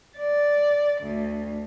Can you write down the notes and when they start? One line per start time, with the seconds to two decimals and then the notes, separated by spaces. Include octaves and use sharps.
0.17 D5
1.01 D2